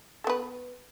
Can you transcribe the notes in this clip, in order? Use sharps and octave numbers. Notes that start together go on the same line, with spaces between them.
B3 A4 B4